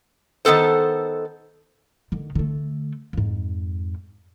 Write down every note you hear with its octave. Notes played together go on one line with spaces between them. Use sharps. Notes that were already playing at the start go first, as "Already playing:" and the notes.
D#3 F3 B3 A4 C5
D3 D#3
D3 A3
F2 G#2